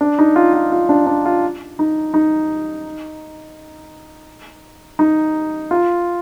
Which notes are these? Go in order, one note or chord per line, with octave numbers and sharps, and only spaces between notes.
D4
D#4
F4
F4
F4
D4
D4
F4
D#4
D#4
D#4
F4